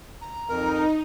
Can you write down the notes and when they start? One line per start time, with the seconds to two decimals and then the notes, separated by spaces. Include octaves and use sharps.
0.21 A#5
0.49 F2 D#4 A#4